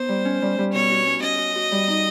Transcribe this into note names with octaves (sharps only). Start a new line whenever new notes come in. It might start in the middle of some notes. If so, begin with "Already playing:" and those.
Already playing: B3 D#4 C5
G3
C#4
G3
G3
B2 C#5
F#4
C#4
C#4 D#5
F#4
F#4
G3
D#4